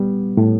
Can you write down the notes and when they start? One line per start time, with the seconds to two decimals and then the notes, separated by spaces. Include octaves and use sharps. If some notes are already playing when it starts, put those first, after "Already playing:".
Already playing: G3 B3
0.37 A2